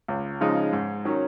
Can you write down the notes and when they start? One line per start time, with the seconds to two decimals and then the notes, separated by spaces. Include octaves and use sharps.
0.08 C#2
0.41 C#3 F3 G#3 D#4
0.73 G#2
1.05 D#3 F#3 C#4